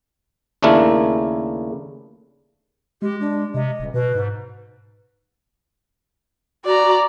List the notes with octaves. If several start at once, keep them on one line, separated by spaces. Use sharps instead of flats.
D#2 C#3 A3 D4 E4 A#4
G#3 G4
D4
C3 D#5
D#1
B2 B4
G#2
F#4 D5 A#5